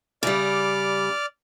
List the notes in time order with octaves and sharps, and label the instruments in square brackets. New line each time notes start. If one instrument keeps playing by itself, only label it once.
[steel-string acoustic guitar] C#3 G3 [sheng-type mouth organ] D5 D6 F6